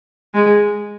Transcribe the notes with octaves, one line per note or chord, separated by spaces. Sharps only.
G#3